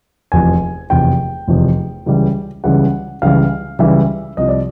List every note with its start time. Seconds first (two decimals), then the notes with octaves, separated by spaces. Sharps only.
0.32 F1 E2 C3 F3 G#5
0.90 F1 E2 C3 F3 G5
1.47 F1 E2 C3 F3
2.06 C#2 C#3 E3 G3
2.64 C#2 C#3 E3 G3 F#5
3.22 C#2 C#3 E3 G3 F5
3.79 C#2 C#3 E3 G3 E5
4.37 C2 C3 F3 D#5
4.48 D5